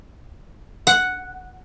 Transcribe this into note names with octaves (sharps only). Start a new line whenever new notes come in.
F#5